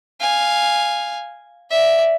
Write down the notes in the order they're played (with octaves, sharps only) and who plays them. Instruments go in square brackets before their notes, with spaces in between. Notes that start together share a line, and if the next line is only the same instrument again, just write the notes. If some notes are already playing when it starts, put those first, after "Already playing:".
[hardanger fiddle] F5 G#5
D5 E5